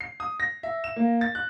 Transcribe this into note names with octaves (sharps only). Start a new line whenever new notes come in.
C7
D#6
A#6
E5
E7
A#3
A6
F#6